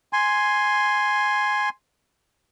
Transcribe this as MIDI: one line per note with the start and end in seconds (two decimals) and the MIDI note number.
0.13 1.69 80
0.13 1.69 84